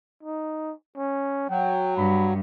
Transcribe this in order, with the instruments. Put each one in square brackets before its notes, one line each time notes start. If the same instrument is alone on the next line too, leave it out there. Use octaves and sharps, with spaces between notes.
[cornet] D#4
C#4
[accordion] F#3 [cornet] G5
[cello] G2 [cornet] B5